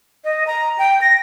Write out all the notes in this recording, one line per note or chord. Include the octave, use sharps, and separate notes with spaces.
D#5
A#5
G5
A#6